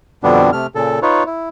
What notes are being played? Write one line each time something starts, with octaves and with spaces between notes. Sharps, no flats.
F2 B2 D3 G3 B3 D4
C3 A3 F6
A#2 C#3 A4
D#4 F4 B4 C#5
E4